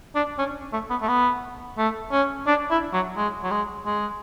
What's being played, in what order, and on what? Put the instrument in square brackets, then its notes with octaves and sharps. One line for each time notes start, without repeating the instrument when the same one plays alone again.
[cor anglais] D4
C#4
A3
B3
A3
B3
A3
C#4
D4
E4
F#3
G#3
F#3
G#3
G#3